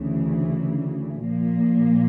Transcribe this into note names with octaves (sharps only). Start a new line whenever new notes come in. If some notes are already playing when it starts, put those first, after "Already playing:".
Already playing: D2 C#3 E3
A#2 F3 A#3